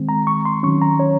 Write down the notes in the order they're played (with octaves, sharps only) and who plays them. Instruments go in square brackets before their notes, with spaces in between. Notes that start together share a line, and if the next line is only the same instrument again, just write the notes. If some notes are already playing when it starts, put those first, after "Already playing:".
Already playing: [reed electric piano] D#3 G#3 C4
A#5
C#6
C6
D#3 F#3 C#4 C#6
A#5
C#5